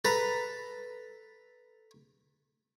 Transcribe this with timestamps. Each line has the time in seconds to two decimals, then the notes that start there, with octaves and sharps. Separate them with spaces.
0.05 A4 B4 A#5